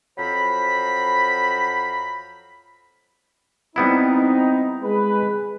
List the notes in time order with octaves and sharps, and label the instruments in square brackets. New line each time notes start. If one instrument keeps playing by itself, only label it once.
[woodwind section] F2 F#3 C5 A#5 B5
[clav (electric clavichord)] G3 B3 E4 [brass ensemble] C4 D#4
[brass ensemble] G#3 B4